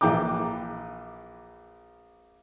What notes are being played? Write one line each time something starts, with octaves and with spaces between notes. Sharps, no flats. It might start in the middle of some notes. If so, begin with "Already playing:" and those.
A#1 E3 G5 A#5 D6